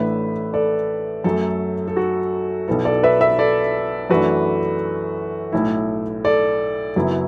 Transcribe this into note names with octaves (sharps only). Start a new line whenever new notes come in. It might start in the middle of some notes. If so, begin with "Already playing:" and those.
Already playing: A1 A2 A3 D4 B4 E5
A4 D5
F#2 F#3 A3 A4
A4
F#4
B1 B2 B3 E4 A4
A4 D5
B4 E5
B4 E5
A4 D5
F#2 E3 A3 D4 F#4 B4
B1 A2 A3 E4
A4 D5
F#1 F#2 F#3 B3 E4